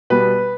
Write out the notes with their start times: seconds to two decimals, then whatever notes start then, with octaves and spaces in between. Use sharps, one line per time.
0.10 B2 G3 B3 B4